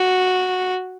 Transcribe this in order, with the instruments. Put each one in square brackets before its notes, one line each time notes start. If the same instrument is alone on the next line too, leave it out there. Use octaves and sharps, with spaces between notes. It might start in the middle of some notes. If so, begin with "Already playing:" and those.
Already playing: [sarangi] F#4